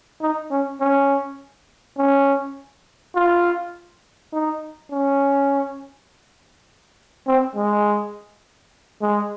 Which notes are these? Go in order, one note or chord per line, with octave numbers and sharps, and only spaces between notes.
D#4
C#4
C#4
C#4
F4
D#4
C#4
C4
G#3
G#3